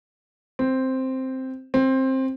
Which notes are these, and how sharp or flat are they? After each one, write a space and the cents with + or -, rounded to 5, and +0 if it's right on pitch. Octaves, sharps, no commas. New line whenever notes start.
C4 +0
C4 +15